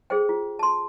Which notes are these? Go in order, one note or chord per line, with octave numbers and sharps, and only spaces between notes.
G#4 A4 C5 G5
F4
A5 C6